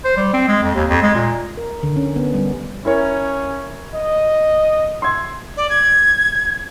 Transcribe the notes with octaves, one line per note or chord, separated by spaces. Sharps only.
C5
G3
C4
G#3
F2
D#2
F2
G#3
A#2
A#4
D3
C#4
B3
G3
C#4 E4 A#4 C#5
D#5
C6 E6 G#6
D5
G#6